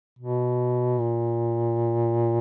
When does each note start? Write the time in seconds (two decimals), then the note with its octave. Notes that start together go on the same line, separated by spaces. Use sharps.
0.19 B2
1.00 A#2